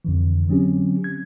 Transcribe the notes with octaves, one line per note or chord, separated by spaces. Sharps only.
F2 D3 E3
D3 F#3 C4 C#4 G4
G#6